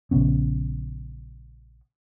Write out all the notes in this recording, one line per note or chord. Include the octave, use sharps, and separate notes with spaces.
A#1 C#3 B3 C#4